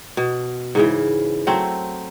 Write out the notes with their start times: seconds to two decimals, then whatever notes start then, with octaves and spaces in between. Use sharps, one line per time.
0.17 B2
0.75 G#2 C#3 E3
1.47 F#3 A3 C4